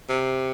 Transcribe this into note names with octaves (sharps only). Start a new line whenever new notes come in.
C3